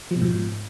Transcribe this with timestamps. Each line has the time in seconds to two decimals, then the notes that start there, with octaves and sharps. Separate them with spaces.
0.11 F3
0.16 B2
0.21 G#2